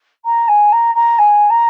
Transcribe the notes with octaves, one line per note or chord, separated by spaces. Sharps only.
A#5
G#5
A#5
A#5
G#5
A#5